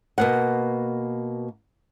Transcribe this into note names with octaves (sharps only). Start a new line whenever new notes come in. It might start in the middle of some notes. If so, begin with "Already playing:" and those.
B2 A#3 F#5